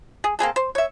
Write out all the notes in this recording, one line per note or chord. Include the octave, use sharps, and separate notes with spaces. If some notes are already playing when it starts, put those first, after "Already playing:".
G#4
A#3 C4 G#4 A4
C5
C#5 E5